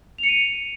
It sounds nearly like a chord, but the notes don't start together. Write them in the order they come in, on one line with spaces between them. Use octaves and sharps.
F7 C#7 D#7